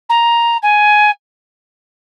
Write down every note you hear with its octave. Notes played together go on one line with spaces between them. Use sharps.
A#5
G#5